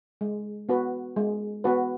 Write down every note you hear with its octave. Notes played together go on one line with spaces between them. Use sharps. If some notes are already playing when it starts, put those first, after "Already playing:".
G#3
B3 F#4 B4
G#3
B3 F#4 B4